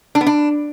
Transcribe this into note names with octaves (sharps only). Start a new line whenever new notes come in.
D4
B3
D4